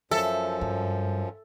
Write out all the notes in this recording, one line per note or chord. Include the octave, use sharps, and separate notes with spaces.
F#2 F3 A4 E5
G2